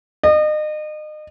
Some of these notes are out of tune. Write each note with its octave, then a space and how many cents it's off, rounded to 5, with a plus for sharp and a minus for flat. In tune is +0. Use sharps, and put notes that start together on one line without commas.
D#5 -35